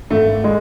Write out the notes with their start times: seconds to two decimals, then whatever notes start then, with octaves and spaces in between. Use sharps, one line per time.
0.10 G#1 A3
0.44 G#3